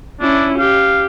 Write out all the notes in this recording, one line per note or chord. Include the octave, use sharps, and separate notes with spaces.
C#4 D4 E4
G4 F5